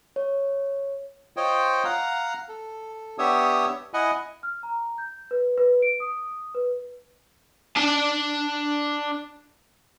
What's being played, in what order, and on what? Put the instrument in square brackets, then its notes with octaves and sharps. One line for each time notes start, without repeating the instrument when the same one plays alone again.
[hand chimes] C#5
[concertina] F4 C5 C#5 D#5 G5
F5 F#5 A#5
A4
B3 D4 G4 C#5 E5 D#6
E4 D#5 F#5 G#5
[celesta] F6
A#5
G6
B4
B4
D7
D#6
B4
[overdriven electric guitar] D4 A5